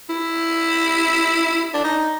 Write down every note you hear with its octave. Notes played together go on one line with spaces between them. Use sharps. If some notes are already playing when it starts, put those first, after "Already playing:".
E4
D4
D#4